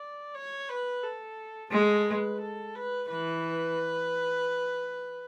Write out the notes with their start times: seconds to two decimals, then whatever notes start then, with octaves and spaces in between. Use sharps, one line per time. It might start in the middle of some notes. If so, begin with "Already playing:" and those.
Already playing: D5
0.35 C#5
0.69 B4
1.04 A4
1.71 G#3 A4
2.07 B4
2.41 A4
2.75 B4
3.09 E3 B4